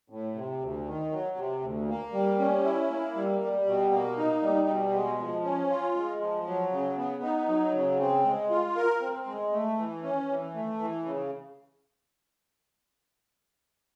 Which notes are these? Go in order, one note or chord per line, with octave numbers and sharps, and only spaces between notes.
A2
C3
D2
D#3
F#3
C3
D2
A#3
G3
C#4
E4
A#3
G3
G3
B2
A#3
D#4
G3
B2
G#3
F3
C#4
F4
G#3
F3
F#3
C#3
B3
D#4
F#3
C#3
C4
G#3
F4
A#4
C4
G#3
A3
E3
C#4
E3
A3
E3
C#3